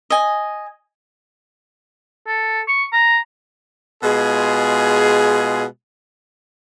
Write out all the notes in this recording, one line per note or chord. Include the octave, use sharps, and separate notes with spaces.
D#5 G#5
A4
C#6
A#5
B2 G#3 F4 G#4